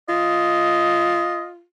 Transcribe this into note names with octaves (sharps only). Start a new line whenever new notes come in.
F4 D#5